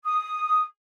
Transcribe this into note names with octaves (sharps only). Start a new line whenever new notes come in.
D#6